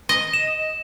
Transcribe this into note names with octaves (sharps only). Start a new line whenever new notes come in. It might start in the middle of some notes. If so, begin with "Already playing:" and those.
D#5
E7